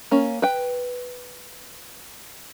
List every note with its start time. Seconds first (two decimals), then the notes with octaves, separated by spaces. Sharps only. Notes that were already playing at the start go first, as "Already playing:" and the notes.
0.11 A#3 C#4
0.42 B4 G5